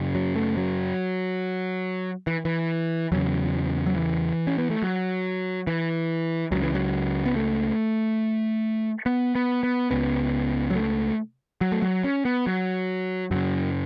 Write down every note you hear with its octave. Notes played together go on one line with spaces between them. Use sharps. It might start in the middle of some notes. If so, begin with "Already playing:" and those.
Already playing: F#2 C#3
F#3
A3
F#3
E3
E3
E2 C#3 F#3
F#3
E3
C#4
B3
A3
F#3
E3
C#2 C#3 F#3
E3
F#3
B3
A3
B3
B3
B3
C#2 C#3 B3
F#3
A3
F#3
A3
F#3
C#4
B3
F#3
F#2 C#3 F#3